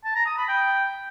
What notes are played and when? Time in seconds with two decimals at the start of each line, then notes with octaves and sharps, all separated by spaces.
0.04 A5
0.15 A#5
0.26 D#6
0.37 B5
0.48 G5